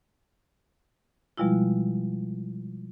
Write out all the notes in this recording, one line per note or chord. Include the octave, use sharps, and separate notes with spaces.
B2 F3 G3 G#3 E4 F4